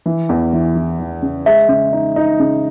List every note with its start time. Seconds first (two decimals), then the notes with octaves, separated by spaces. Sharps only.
0.06 E3
0.29 E2
0.53 E3
0.76 E3
0.99 E3
1.22 C#3
1.46 G#3 E5
1.69 C#3
1.93 D#4
2.16 D#4
2.39 C#3